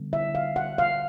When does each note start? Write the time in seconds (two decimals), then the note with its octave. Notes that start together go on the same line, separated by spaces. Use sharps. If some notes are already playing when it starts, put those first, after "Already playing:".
Already playing: D3 G3 B3
0.13 E5
0.35 F5
0.56 F#5
0.78 F5